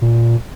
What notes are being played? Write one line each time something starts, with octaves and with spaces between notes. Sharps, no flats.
A#2